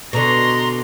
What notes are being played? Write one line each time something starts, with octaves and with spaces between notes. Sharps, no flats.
B2 D3 A#5 C6